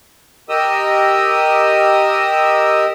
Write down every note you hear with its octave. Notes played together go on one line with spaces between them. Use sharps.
G4 A#4 D#5 D#6 E6